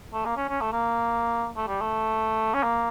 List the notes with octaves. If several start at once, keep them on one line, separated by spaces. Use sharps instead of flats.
A3
A#3
C#4
C#4
A3
A#3
A3
G3
A3
C#4
A#3